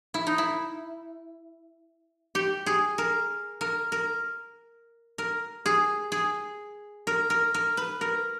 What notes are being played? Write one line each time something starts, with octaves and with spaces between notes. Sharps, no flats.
E4
D#4
E4
G4
G#4
A#4
A#4
A#4
A#4
G#4
G#4
A#4
A#4
A#4
B4
A#4